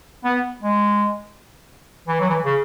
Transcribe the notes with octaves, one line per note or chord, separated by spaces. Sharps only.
B3
G#3
E3
F#3
E3
C#3